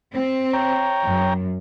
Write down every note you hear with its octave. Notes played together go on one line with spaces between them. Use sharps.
C4
C#5 G5 A#5
F#2